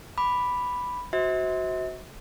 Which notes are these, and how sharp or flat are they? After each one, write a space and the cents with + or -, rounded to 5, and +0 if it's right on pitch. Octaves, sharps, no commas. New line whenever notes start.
B5 +0 D6 +0
F#4 +0 C5 +0 E5 -40